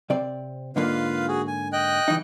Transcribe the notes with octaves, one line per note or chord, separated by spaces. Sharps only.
C3 C4 D5
G#2 D3 A#3 F4 B4 F5
F#4 G#4
G#5
D#5 G5 F#6
C2 E3 D#4